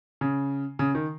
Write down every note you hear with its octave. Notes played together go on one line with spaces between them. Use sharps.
C#3
C#3
D#3